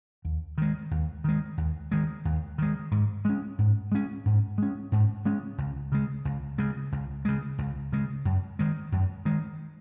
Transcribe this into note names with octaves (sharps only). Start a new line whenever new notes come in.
D#2
D#3 G#3
D#2
D#3 G#3
D#2
D#3 G#3
D#2
D#3 G#3
G#2
G#3 C#4
G#2
G#3 C#4
G#2
G#3 C#4
G#2
G#3 C#4
C#2
C#3 G#3
C#2
C#3 G#3
C#2
C#3 G#3
C#2
C#3 G#3
F#2
D#3 G#3
F#2
D#3 G#3